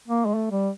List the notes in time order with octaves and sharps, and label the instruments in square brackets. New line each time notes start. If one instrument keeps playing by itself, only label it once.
[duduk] A#3
G#3
A3
G3